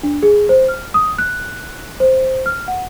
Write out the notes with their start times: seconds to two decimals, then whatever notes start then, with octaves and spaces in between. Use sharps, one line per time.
0.03 D4
0.23 G#4
0.49 C5
0.68 F6
0.94 D#6
1.18 F#6
2.00 C5
2.46 F6
2.68 F#5